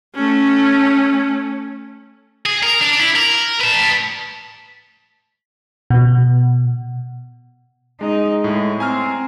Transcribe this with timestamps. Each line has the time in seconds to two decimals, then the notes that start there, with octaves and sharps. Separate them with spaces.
0.15 A3 C#4
2.46 G#4
2.63 A#4
2.81 D4
3.00 E4
3.15 A#4
3.60 B4 A5
5.90 B2
8.01 G#3 D#4
8.44 A2 G#3
8.80 C4 G#5 A#5 F6